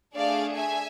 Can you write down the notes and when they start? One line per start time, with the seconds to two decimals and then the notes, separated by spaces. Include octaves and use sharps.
0.16 A3 D4 G#4 D5 F5
0.55 E5 G#5